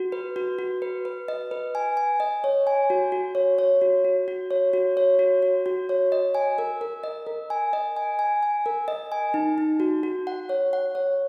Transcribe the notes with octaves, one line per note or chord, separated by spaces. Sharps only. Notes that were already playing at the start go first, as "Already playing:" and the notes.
Already playing: F#4
B4
F#4
F#4
B4
B4
D#5
B4
G#5
G#5
D#5
C#5
G#5
F#4
F#4
C#5
C#5
F#4
F#4
F#4
C#5
F#4
C#5
F#4
F#4
F#4
C#5
D#5
G#5
A#4
A#4
D#5
A#4
G#5
D#5
G#5
G#5
G#5
A#4
D#5
G#5
D#4
D#4
F#4
F#4
F#5
C#5
F#5
C#5